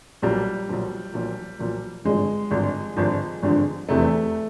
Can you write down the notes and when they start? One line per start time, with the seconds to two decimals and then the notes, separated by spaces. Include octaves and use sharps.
0.22 B1 A#2 F3 G3
0.69 B1 A#2 F3
1.14 B1 A#2 F3
1.59 B1 A#2 F3
2.05 G#1 G2 D3 F3 G#3
2.51 G#1 G2 D3 F3
2.96 G#1 G2 D3 F3
3.43 G#1 G2 D3 F3
3.89 F1 E2 C3 E3 A3